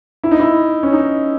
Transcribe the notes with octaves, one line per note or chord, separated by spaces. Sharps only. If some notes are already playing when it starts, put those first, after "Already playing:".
E4
D#4
E4
C#4
D#4